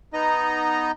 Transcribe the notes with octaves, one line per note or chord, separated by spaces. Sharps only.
B3 D#4 D#5 A#5